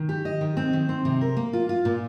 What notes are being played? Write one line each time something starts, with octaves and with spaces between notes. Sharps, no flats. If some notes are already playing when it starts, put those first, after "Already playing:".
Already playing: D#3
G4
D#5
D#3
C4
D#3
C4
C3
A#4
A#3
F4
F4
A#2